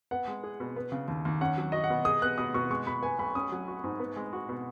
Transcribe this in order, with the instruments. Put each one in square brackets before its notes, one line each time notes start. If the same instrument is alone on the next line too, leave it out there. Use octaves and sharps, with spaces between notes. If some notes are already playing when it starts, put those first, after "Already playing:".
[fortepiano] B3 [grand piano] F#5
[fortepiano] G#3
G#4
B2
B3
C#3
D#2
D#2
[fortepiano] C#4 [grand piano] F#5
[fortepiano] F#3
[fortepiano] F#4 [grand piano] D#5
[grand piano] F#5
[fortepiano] B2
[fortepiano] G#4 [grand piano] D#6
[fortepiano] B3 [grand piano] F#6
[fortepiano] B2 [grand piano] D#6
[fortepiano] B2 [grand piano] C#6
[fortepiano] G#3 [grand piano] C#6
[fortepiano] B2 [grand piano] B5
[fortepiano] B3 [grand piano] G#5
[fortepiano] B1 [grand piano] B5
[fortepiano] C#4 [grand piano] D#6
[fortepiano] F#3
F#4
G#2
B3
G#3
F#4
B2